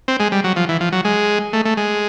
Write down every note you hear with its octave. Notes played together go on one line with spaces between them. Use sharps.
C4
G#3
G3
F#3
F3
E3
F3
F#3
G#3
A3
A3
G#3